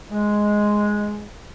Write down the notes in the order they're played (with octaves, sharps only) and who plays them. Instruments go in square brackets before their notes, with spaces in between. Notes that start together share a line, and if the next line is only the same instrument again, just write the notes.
[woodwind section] G#3